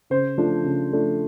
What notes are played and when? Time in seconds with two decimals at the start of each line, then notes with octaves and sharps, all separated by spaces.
0.10 C#3 C5
0.38 F3 A3 D4
0.64 C#3
0.92 F3 A3 D4